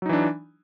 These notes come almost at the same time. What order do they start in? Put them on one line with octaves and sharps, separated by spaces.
F#3 D#4 E3 D4